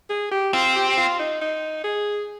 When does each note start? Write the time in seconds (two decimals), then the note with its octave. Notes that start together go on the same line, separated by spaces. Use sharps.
0.10 G#4
0.32 G4
0.53 C4 F4
0.76 G4
0.88 G4
0.97 F4
1.19 D#4
1.41 D#4
1.84 G#4